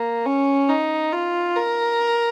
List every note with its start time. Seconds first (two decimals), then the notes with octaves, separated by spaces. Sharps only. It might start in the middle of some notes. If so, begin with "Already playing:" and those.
Already playing: A#3
0.26 C#4
0.68 D#4
1.12 F4
1.55 A#4